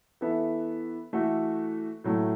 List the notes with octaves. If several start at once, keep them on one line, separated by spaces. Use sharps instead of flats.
E3 B3 A4 E5
E3 A3 F#4 A4 E5
A2 F#3 A3